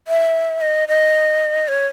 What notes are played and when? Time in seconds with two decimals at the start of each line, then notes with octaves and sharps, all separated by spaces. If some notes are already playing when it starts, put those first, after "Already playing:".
0.08 E5
0.61 D#5
0.88 D#5
1.68 C#5